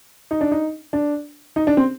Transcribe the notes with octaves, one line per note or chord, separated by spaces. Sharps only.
D#4
D4
D#4
D4
D#4
D4
C4